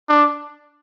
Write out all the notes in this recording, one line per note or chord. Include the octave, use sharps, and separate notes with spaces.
D4